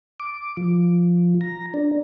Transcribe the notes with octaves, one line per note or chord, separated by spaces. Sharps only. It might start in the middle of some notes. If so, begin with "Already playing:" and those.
D6
F3
A#5
D4